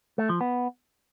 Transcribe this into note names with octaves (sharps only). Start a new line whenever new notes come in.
A3
F3
B3